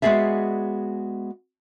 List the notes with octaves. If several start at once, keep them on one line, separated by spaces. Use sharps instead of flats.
G#3 B3 F#4 G#4 D5 E5